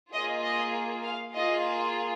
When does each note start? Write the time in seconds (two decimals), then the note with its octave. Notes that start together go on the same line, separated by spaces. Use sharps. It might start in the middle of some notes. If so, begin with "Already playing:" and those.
0.13 A#3 F4 G#4 D#5
0.43 D#5
1.04 F5
1.34 A#3 F4 G#4 D#5